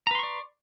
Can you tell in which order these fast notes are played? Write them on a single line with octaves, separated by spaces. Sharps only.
A#5 B4 C6 C#6 D5